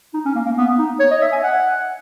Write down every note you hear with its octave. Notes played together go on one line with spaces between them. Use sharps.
D#4
C#4
A#3
A#3
B3
D#4
C#5
D#5
E5
G#5
F#5